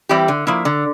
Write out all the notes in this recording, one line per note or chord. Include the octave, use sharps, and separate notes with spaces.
E3 G3 C4 G4
D3
F3 A#3 E4
D3